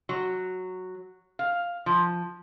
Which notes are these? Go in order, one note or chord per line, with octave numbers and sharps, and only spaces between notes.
F#3
F5
F3